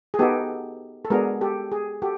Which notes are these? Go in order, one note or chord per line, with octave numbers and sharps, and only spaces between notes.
G#4
B3 D#4 F#4 G4 A4
A4
G#3 B3 D4 F#4 G#4 A#4
G4 A4
G#4
F#4 G4 A4